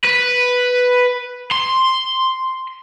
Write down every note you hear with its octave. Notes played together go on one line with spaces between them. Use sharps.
B4
C6